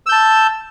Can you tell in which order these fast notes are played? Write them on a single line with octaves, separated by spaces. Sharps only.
E6 G6 A5